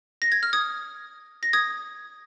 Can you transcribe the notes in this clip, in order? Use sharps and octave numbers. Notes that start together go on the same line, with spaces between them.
A#6
G#6
F6
D#6 G#6
A#6
D#6 G#6